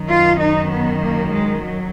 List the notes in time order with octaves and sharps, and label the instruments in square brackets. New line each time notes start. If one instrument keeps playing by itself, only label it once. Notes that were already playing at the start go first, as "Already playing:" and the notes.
Already playing: [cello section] F#2 D#3
F4
D#4
B3
A#3
G#3
F#3